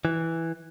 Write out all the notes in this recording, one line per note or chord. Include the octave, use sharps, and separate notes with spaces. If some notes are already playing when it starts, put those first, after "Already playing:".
E3